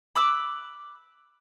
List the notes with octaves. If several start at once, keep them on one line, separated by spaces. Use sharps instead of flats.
B5 D6 E6 F#6